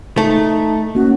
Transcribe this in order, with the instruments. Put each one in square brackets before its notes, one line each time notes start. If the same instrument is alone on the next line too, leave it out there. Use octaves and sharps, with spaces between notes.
[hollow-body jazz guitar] A3 [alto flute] D#4
[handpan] A#3 C#4 [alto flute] F#4